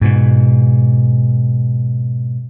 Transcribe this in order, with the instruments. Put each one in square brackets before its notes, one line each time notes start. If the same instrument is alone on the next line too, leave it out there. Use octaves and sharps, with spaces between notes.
[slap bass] G#2 B2